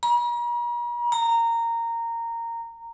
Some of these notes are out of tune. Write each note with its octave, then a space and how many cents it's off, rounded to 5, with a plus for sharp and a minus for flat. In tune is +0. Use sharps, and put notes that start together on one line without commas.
A#5 +45
A#5 -15